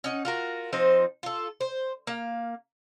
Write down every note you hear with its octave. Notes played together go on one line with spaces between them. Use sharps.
C#4 D#4 F#5
F4 F#4 A#4
F3 C4 D#4 C5
F4 A4
C5
A#3 F5